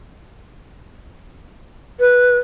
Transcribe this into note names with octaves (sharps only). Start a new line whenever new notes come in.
B4